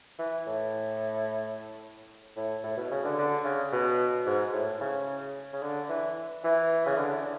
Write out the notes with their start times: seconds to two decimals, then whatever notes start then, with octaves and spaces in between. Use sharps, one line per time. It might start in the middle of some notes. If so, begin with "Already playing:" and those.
0.19 E3
0.47 A2
2.36 A2
2.64 A2
2.77 B2
2.91 C#3
3.05 D3
3.18 D3
3.44 C#3
3.72 B2
4.26 G#2
4.53 A2
4.80 C#3
5.53 C#3
5.62 D3
5.89 E3
6.44 E3
6.86 C#3
6.98 D3